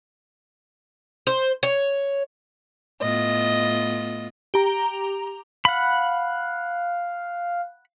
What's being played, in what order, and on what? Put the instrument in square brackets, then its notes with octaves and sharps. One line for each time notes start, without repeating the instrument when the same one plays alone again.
[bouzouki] C5
C#5
[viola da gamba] A2 B3 F4 [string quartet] D#5
[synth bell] G4 A#5
[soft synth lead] F5 [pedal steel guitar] F#5 B5